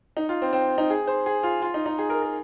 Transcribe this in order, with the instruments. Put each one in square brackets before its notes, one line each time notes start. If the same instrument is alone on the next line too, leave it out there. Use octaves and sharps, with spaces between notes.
[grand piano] D#4
F4
C4
C4
D#4
G#4
C5
G#4
F4
F4
D#4
D#4
G#4
A#4
A#4